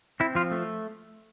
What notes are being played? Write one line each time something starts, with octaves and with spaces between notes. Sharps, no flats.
C4 E4
F3 F4
A3